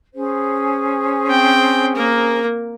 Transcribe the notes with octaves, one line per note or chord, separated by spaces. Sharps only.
C#4 G#4 C5
C4 G5
A#3 A#4